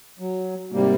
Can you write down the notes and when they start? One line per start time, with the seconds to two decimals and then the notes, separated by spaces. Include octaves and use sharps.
0.19 F#3
0.72 G#2 C3 G3 A#3